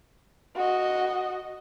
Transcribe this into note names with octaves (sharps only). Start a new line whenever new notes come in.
F#4 D#5